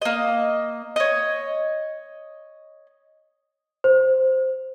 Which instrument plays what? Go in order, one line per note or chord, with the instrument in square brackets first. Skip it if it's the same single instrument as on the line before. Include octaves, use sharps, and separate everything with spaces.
[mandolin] A#3 D#5
C#5 D#5
[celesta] C5